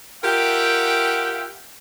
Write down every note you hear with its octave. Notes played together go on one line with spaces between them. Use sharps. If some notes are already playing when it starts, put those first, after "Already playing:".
F4 G4 A#4 E5 F#5 G5